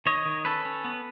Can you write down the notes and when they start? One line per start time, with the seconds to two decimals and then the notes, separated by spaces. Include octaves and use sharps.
0.06 D#3 C#5 D#5
0.26 D#3
0.45 C#4 A4 B4
0.65 C#4
0.84 B3